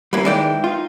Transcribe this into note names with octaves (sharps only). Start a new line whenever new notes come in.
G3 A#3 C#4 E4 B4
D#3 E3 G#3 D5 G5
D#4 F4